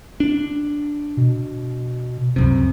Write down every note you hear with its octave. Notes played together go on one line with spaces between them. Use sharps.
D4
B2
C#2 F#2 C3